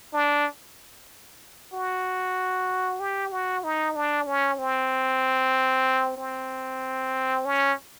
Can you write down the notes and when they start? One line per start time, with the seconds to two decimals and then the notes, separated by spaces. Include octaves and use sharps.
0.13 D4
1.73 F#4
3.00 G4
3.32 F#4
3.64 D#4
3.96 D4
4.27 C#4
4.58 C4
6.17 C4
7.45 C#4